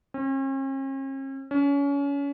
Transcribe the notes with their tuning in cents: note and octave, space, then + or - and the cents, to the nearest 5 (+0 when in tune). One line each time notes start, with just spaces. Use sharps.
C#4 -45
C#4 +30